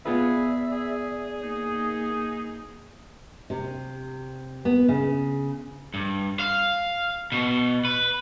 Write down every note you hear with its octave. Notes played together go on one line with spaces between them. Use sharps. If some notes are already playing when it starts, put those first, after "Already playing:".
B3 F4 G#4 B4 D5 E5
G#4
A#3 D#4
C3
B3
C#3
G2
F5
B2
B4